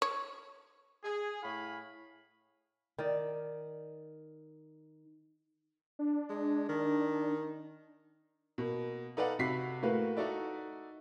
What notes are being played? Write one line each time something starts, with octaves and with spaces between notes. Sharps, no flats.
C#5
G#4
A2 E4 C#5 F5 G#5 B5
D#3 D5
D4
G#3
D#3
B2 A#3
D#4 A4 B4 D5 F5 F#5
C3 F#4 B5 B6 C7
A2 A3 A#3 F#4 B4 F5
D#4 F#4 A4 D5 E5